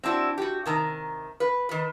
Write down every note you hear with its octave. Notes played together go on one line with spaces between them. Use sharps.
C4 D4 E4 F#4
F#4 G4
C3 D#3 A#5
B4
D#3 B4